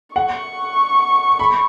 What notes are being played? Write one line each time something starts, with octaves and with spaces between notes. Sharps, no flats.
F#5 C#6
B5